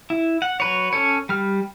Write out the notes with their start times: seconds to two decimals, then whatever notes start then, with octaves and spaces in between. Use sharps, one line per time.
0.10 E4
0.42 F#5
0.60 F#3 B4 C#5
0.93 C#4 A4 C#5
1.29 G3 F6